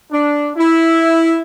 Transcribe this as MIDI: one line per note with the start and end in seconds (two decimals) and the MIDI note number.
0.11 0.51 62
0.57 1.42 64